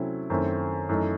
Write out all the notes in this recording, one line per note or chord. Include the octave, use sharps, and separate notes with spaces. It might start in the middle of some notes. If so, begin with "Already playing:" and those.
Already playing: C3 F#3 A3 C#4 E4
F#2 D#3 A3 C4 E4
F#2 E3 A3 D#4